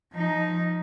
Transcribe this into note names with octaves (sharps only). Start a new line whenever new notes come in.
F3 D#4